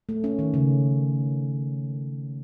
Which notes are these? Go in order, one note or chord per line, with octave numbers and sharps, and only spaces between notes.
A3
C#4
D#3
C#3